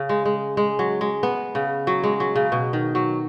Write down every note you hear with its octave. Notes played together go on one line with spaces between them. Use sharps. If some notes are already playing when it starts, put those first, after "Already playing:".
Already playing: C#3
G#3
G#3
G#3
F#3
G#3
B3
C#3
F#3
G#3
F#3
C#3
B2
D#3
F#3